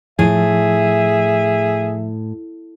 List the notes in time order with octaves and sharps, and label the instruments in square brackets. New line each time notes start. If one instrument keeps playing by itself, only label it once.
[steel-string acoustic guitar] A2 [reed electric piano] F3 [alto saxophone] G#4 [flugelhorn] E5